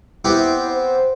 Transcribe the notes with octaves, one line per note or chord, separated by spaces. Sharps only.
B3 C4 E4 G4
C5